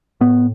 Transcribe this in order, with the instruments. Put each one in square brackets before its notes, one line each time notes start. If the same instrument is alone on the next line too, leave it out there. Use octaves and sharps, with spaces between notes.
[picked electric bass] A2 B3